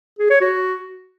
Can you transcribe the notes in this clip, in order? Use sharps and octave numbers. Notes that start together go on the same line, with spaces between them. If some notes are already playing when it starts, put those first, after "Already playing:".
G#4
C#5
F#4